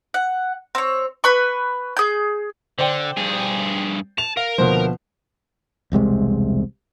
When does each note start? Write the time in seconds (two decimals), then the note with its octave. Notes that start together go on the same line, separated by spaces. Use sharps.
0.14 F#5
0.75 C4 C#5
1.24 B4 B5 C#6
1.97 G#4 G6
2.78 D3 C5 D5 G5
3.17 G2 G#4
4.18 A5 F7
4.37 A#4 F5
4.58 D2 B2 F3 A#3 B3 C5
5.92 E1 C2 C3 G#3